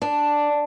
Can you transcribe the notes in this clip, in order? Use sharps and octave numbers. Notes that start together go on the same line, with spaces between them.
D4